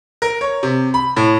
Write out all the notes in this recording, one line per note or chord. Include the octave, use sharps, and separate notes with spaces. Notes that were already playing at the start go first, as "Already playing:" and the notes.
A#4
C#5
C3
B5
A2